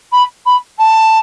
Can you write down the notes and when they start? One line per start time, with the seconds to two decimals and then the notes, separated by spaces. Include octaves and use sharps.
0.12 B5
0.46 B5
0.78 A5